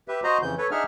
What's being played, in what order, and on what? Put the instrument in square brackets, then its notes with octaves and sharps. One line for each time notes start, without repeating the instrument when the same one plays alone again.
[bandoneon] G4 B4 E5
F#4 C5 D#5 A#5
F2 C#3 E3 G6
A4 B4 C#5
D4 D#4 G#4 E5 F#5 F6